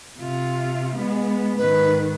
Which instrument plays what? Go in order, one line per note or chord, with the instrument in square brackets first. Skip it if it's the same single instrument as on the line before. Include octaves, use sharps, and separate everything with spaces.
[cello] C3 F4
G#3 B3
[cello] G#2 D#3 [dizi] B4